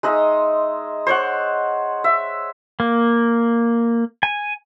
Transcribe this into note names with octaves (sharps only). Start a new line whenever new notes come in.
G#3 D#4 D#5 E5
C5 C#5 F#5
E5
A#3
G#5